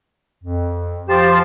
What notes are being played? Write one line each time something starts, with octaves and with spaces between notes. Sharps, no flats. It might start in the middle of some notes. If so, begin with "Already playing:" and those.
F2
F3 G4 C5 A5